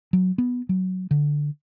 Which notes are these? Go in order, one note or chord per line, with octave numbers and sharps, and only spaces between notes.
F#3
B3
F#3
D3